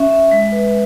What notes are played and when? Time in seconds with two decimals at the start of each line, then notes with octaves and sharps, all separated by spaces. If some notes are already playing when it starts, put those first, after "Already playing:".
Already playing: C#4 E5
0.10 E5
0.31 G#3
0.52 B4